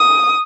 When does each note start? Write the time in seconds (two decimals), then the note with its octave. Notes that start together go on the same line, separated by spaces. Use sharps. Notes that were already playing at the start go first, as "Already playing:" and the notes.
Already playing: D#6